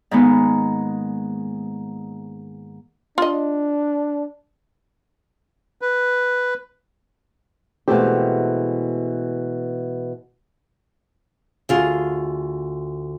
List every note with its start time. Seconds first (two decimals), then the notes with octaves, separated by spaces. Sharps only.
0.11 G#2 D#3 G#3 A#3 B3 D#4
3.18 D4 F4 D#5
5.81 B4
7.88 B2 E3 G#3 A3 C4 G4
11.69 D2 F4 G#4